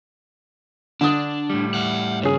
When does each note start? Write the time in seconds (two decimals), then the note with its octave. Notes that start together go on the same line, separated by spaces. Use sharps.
1.01 D3 D4 D#6
1.50 A2 G3
1.74 E5 F#5
2.23 G2 C#3 C#4 G#4